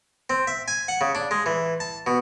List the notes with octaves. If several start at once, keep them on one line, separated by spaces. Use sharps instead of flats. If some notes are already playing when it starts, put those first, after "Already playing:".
C4
E5
G#5
F#5
C#3
D4
G#3
E3
A5
B2